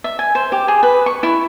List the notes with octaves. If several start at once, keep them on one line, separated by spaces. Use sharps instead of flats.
E5
G#5
C5
G4
G#4
B4
C#6
E4